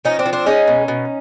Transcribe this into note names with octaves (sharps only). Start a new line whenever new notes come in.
F3 C#4 D#4
C4 D4
F3
C4 D4
G#3 C#4 D#4
B2
B2